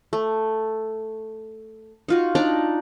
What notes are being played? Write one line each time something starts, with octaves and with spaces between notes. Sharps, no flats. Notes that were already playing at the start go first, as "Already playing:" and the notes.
A3
D#4 F4 F#4
D4 D#4 D5 A#5